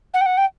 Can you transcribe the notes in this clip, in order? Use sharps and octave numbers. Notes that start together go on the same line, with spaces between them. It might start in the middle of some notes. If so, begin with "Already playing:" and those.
F#5
G5
F#5
G5